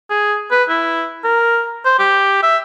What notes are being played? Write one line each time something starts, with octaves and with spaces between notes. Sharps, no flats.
G#4
B4
E4
A#4
C5
G4
E5